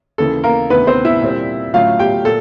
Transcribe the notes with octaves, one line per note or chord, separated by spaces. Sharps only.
D#2 C#3 E3 A4
A#3 A#4
D2 C3 D#3 B3 B4
C4 C5
E4 E5
A#2 G3 C4
A2 F#3 A3 C#4 F4 F5
G4 G5
A#2 A4